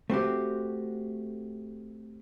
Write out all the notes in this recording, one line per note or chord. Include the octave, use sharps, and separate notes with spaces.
A3 C4 F#4 G4